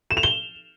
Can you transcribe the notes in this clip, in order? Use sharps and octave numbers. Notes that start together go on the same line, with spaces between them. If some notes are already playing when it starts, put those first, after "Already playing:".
E7
F7
G7